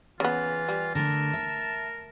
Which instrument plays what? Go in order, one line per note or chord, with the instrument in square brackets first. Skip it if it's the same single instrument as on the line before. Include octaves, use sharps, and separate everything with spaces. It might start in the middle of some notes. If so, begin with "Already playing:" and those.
[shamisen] C#3 B3 [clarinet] E3 [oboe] F4
[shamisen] G3
[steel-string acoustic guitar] D3 A3 [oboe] A#4 [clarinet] A5
[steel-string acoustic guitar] E5